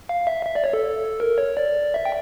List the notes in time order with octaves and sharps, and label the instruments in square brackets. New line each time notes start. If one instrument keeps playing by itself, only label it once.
[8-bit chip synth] F5
E5
E5
D5
C#5
A4
A#4
C#5
D5
E5
G5